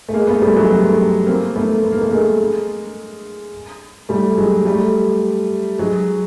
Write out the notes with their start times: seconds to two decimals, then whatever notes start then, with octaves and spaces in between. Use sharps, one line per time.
0.09 A3
0.14 G#3 A#3
0.27 A3 B3
0.42 G3 A3
0.56 F#3 G#3
0.70 A3 B3
1.27 A#3 C4
1.56 A3 B3
1.84 B3
1.93 A#3
2.01 A3
2.11 G#3 A#3
4.09 G3 A3
4.38 F#3 G#3
4.65 G3 A3
5.78 F#3 G#3